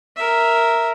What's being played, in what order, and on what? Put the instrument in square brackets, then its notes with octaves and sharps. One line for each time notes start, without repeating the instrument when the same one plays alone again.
[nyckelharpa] A#4 E5